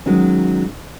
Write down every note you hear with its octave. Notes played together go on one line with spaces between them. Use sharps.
D#3 F#3 G#3 C#4